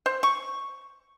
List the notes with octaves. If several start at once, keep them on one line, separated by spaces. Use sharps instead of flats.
C5
C#6